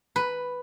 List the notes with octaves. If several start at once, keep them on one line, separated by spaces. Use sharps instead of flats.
B4